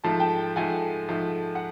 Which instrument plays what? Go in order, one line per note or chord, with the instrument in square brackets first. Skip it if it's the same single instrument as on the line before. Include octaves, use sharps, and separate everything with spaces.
[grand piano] G#2 F3 A3 A5
G5 A5
G#2 F3 A3 F#5 G#5
G#2 F3 A3
F#5